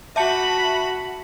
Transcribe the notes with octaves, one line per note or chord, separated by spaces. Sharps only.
F#4 E5 A5 B5 C#7